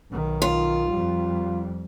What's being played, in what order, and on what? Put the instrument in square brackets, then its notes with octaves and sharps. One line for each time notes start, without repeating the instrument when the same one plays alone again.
[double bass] B1 D#3
[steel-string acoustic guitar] F4
[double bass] F2 G3